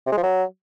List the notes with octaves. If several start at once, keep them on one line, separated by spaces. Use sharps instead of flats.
C3
G#3
F3
F#3